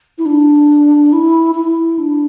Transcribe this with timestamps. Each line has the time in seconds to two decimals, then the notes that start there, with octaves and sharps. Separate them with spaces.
0.18 E4
0.26 D4
1.13 E4
1.55 E4
1.99 D4